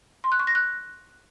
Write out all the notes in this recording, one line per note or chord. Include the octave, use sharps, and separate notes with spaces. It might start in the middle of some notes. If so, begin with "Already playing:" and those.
C6
F#6
C#6
A#6
F#6